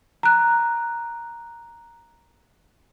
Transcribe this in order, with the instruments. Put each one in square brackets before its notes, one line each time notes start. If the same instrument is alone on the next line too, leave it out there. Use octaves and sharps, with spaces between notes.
[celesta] A#5 F#6